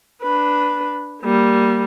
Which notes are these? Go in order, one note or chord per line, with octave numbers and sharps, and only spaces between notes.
D4 B4
G3 A#3